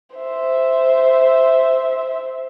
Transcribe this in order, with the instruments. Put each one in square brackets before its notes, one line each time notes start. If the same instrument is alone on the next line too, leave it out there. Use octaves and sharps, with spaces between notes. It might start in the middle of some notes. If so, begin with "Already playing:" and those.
[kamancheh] C5 E5